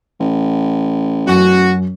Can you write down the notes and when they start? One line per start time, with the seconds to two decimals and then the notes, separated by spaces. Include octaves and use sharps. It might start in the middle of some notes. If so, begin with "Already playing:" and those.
0.20 A1
1.27 F#2 F#4